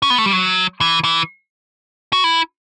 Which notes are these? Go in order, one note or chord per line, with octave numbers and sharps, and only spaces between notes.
C#4
B3
A3
G3
F#3
E3
E3
F#4
E4